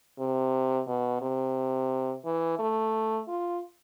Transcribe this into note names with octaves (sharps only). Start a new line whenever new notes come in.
C3
B2
C3
E3
A3
F4